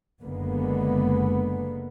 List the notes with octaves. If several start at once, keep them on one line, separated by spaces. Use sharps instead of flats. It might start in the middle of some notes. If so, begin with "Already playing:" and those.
F#1 D3 G#3 A#3 B3